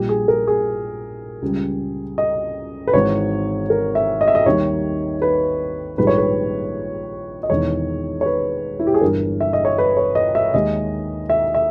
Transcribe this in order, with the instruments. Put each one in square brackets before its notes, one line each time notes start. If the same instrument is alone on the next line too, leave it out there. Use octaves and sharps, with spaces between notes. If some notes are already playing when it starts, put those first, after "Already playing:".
Already playing: [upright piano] A#1 A#2 G3 G4
G#4
A#4
G#4
C#2 C#3 G3
D#5
B4
G#1 G#2 E3 C#5
A#4
E5
D#5
E5
D#5
D#2 D#3 G3 C#5
B4
A#1 G#2 D#3 G3 B4
C#5
B4
D#5
E1 E2 D#3 C#5
C#5
B4
E4
G4
G#4
G1 G2 E3 A#4
E5
D#5
C#5
B4
C#5
D#5
E5
D#2 D#3 G#3 D#5
E5
E5